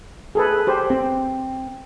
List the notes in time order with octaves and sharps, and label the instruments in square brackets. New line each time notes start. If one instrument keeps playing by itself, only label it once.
[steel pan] G#4 A4 B4
G4 C5
[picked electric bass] C4